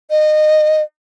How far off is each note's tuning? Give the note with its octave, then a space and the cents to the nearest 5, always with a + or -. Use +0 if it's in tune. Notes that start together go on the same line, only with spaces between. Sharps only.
D#5 -25